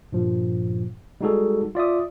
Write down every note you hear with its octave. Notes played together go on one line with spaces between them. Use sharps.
G2 A#2 F3
G3 G#3 D#4 F#4 G#4 A4
F4 D5 E5 D#6